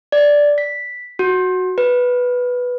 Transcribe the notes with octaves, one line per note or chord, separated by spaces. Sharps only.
D5
B6
F#4
B4